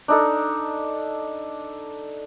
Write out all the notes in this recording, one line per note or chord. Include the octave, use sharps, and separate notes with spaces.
D4 D#4 A4